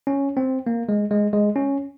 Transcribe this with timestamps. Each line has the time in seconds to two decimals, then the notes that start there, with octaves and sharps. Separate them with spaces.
0.07 C#4
0.37 C4
0.67 A#3
0.89 G#3
1.11 G#3
1.33 G#3
1.56 C#4